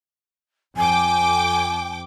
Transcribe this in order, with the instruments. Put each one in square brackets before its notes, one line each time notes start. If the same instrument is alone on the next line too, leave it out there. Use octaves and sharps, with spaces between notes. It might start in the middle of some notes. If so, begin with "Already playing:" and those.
[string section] F2 G5 D6 [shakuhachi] G#5